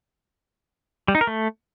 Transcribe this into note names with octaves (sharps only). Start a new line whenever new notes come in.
G3
D#4
A#4
A3